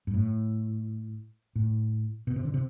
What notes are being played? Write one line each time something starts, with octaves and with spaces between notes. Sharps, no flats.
G2
A2
A2
B2
C3
D3
C3